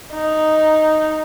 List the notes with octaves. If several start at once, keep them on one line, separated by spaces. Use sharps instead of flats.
D#4